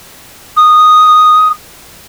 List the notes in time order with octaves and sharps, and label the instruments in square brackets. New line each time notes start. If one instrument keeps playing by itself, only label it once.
[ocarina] D#6